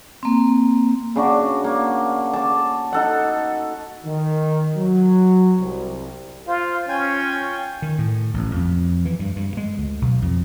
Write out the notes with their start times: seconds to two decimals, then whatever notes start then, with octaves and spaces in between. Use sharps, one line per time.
0.23 A#3 C4
1.16 C#3 D4 F#4
1.64 A#3
2.33 A5 D6
2.92 D#4 A4 F#5
4.06 D#3
4.76 F#3
5.60 C2
6.48 F4 C5
6.89 C#4 F4 G5 G#5
7.82 D#3
7.98 A2
8.34 A1
8.56 F2
9.05 E3
9.19 G2
9.36 G2
9.57 G#3
9.78 D2
10.02 B1
10.22 F2